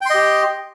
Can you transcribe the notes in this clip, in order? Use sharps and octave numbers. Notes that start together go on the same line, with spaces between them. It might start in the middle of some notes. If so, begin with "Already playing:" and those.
G4 D#5 G5 C6